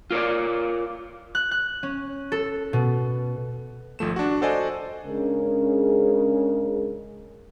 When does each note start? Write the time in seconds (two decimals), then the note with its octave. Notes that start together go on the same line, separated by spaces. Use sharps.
0.11 F4 A#4 C#5 D5
1.35 F#6
1.51 F#6
1.83 C#4
2.32 A4
2.73 B2
3.99 G#1 F3 A3 E7
4.16 D4 F#4
4.42 F#4 A4 C5 D5 D#5 G#5
5.06 C#3 G#3 C#4 D4 G#4 A#4